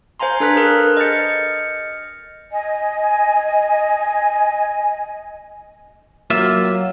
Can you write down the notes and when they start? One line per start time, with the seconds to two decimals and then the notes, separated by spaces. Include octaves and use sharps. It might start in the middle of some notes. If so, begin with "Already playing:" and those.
0.20 C5 F5 G#5 A#5 C6
0.40 D4 A4 B4 A#5 F#6 B6
0.56 G#4 A#4
0.97 D#5 F6 G6 A6 C#7
2.51 D#5 G#5
6.30 F#3 A#3 F4 E5